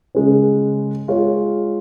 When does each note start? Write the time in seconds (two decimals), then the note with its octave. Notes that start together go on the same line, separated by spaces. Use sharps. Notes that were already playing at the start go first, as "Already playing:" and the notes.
0.15 C#3 G#3 C#4
1.08 G#3 F4 C#5